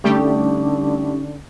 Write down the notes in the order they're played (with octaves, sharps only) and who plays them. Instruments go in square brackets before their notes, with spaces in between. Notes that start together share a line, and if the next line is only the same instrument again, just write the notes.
[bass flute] D3 [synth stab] G3 A3 G4 [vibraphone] C#4 D#4